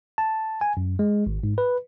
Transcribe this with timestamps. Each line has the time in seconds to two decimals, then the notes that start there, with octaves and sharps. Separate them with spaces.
0.18 A5
0.61 G#5
0.77 F#2
0.99 G#3
1.26 G#1
1.43 G#2
1.58 B4